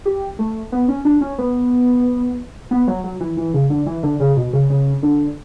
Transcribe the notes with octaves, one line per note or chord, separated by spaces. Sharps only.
G4
A3
B3
C#4
D4
C#4
B3
B3
F#3
F#3
E3
E3
C#3
D3
E3
D3
C#3
B2
C#3
C#3
D3